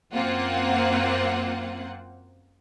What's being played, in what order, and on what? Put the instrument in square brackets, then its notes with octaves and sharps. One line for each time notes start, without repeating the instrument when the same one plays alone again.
[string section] F#2 A#3 C4 F4 F#5